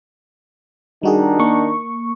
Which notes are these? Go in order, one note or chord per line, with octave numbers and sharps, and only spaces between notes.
D#3 G3 D4 D#4 F#4 G#4
A#3 C#6